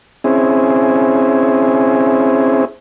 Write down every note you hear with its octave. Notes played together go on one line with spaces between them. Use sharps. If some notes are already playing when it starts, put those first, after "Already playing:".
C4 C#4 E4 G#4